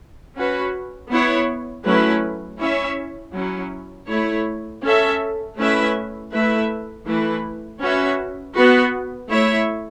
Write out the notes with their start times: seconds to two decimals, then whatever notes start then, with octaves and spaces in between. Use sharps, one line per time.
0.36 C#4 F#4 B4
1.10 B3 E4 C#5
1.85 F#3 A3 C#4 E4 B4
2.59 C#4 E4 C#5 E5
3.34 F#3 C#4 E4
4.08 A3 E4 C#5
4.83 C#4 A4 E5
5.57 A3 C#4 E4 B4 E5
6.33 A3 E4 B4 E5
7.07 E3 A3 E4 B4
7.81 C#4 F#4 B4 E5
8.55 B3 F#4 B4
9.30 A3 E4 C#5 E5